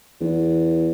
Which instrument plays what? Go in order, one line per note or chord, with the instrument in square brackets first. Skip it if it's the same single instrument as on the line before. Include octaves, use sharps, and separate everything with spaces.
[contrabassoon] E2